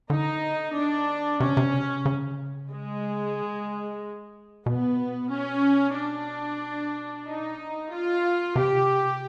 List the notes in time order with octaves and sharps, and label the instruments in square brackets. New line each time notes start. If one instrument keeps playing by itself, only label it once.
[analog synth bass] D3 [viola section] D#4
[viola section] D4
[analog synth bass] C3 [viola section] C#4
[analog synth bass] C3
C#3
C3
C#3
[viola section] G#3
[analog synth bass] B2 [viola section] B3
[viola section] C#4
D4
D#4
F4
[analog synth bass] C3 [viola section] G4